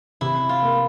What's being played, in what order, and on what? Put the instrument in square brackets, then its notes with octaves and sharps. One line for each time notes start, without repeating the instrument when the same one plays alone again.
[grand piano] C3 [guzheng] E4
[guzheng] F4
[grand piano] A#3